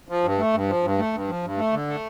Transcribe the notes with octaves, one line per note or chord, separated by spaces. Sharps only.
F3
G2
A3
G2
F3
G2
A3
G2
F3
G2
A3
D3
A3